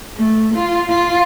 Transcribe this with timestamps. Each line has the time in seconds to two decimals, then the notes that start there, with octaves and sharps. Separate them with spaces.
0.15 A3
0.54 F4
0.89 F4